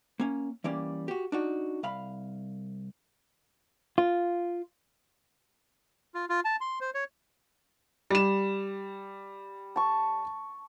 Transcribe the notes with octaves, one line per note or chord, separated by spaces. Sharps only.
A#3 C#4
E3 G3 A#3 C#4 D5
F#4 G4
D4 D#4 F#4
C2 F5 B5
F4
F4
F4
A5
C6
C5
C#5
G3 E7
A5 C#6